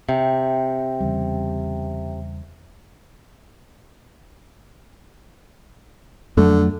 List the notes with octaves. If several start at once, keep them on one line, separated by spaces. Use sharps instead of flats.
C3 E5 G5
E2 C#3 G3
F2 D3 F#3 A3